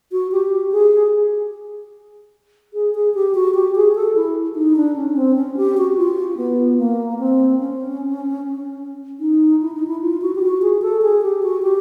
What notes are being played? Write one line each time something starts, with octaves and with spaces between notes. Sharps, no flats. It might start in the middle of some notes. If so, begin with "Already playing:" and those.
F#4
G4
G#4
G#4
G#4
G4
F#4
G4
G#4
A4
E4
D#4
D4
C#4
C4
C#4
G4
F#4
F4
B3
A#3
C4
C#4
D#4
E4
D#4
E4
F4
F#4
G4
F#4
G#4
A4
G#4
G4
F#4
G4